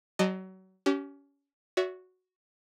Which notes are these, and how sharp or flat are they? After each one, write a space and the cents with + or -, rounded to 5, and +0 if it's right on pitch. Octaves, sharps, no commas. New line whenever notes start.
F#3 +30 D#5 -25 A5 +0
C#4 +25 G4 -30
F#4 -5 C#5 +45 E5 +0